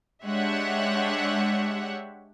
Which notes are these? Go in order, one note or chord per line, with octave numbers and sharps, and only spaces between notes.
G#3 D4 G4 C#5 E5 F#5